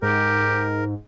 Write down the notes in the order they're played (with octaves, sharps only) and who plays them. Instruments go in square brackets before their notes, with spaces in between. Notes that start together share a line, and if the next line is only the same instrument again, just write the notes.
[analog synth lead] G#2 [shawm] G4 [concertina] A#4